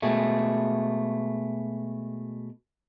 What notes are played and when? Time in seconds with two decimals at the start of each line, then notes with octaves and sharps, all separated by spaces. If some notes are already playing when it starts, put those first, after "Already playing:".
0.02 B2 G#3 A3